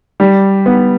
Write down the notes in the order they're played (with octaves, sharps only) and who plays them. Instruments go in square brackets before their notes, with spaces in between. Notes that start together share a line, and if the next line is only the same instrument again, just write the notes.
[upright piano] G3
B3